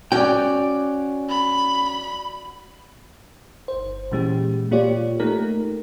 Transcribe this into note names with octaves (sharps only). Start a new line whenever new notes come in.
C#4 F#4 D5 G5
B5
G1 C5
A#2 E3 G#3 C#4 G4
A#2 A#3 F4 G4 C#5 D5
A3 A#3 D#4 G4 A#4